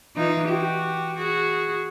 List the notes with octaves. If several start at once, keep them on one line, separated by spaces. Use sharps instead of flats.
E3 D#4 F4
F#4 G4
F#4 G#4